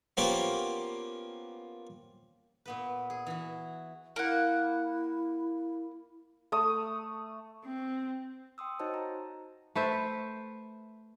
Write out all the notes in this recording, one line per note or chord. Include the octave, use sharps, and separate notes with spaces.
F3 A#3 B3 C#4 G4
A#2 B3 B4
G#4
E3 F#4
A#3 E4 F#5
A3 D#6
C4
G5 C6 D#6 E6
D#4 F#4 C5 C#5 D#5 A5
A#5
A3 B4 C5 E5